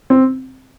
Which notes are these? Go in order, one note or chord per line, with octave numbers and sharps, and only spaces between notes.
C4